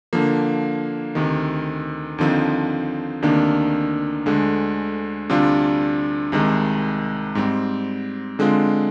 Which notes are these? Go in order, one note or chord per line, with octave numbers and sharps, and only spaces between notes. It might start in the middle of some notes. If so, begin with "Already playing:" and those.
D3 F3 A#3
D2 C3 D#3
D#2 D3 F3 C4 D#4
D2 C3 D#3 A#3 D4
D2 D3 G#3
D2 C3 G3 D4 F4
C2 C3 D#3 G#3
G#2 G3 C4
D3 G#3 C4 F4